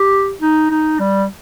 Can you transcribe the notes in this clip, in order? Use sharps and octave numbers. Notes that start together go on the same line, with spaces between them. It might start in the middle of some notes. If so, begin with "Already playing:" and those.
Already playing: G4
D#4
D#4
G3